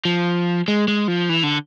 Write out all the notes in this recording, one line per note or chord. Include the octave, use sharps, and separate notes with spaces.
F3
G#3
G#3
F3
E3
D3